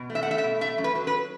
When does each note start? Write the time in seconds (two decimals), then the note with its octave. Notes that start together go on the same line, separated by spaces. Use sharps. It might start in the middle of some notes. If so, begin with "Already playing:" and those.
Already playing: B2
0.10 A3
0.15 E5
0.23 F#5
0.26 A3 E5
0.38 E5
0.44 B2
0.61 A3 E5
0.78 F#2
0.84 B4
0.95 F#3
1.07 B4